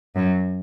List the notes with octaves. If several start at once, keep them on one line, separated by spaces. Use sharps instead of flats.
F#2